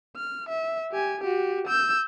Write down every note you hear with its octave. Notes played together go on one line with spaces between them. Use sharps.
F6
E5
G4 G#5
F#4 G4
E6 G6